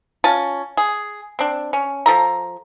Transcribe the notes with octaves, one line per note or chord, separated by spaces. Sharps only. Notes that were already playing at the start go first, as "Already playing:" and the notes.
C#4 F4 A5
G#4
C4 D4
C#4
F3 A4 A#5